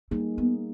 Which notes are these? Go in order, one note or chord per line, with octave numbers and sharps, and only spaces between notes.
G3 A#3 C4 D#4 G#4
B3